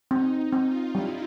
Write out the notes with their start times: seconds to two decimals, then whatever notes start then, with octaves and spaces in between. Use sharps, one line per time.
0.11 C4 D#4
0.53 C4
0.67 F4
0.95 G3 E4